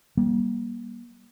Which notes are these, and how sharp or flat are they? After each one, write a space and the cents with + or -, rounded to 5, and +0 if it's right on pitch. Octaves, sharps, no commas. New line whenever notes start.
G3 +0 A#3 +35